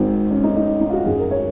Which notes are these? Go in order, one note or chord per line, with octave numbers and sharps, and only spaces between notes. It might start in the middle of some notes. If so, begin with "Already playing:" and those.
Already playing: G#1 G#2 D#3 C4
C#4
D#4
D#4
D#4
F4
F#4
G#1 F#2 D#3 G#4
A#4
C#5